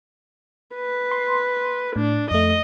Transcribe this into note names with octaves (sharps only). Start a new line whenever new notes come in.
B4
C6
A2 D4
F2 A3 D#5